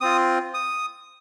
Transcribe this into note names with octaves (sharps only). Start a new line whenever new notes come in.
C4 F4 D#6
D#6